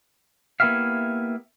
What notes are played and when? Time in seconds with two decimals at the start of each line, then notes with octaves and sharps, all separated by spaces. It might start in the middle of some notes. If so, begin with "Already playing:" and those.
0.60 A#3 B3 E4 G4 E5 F5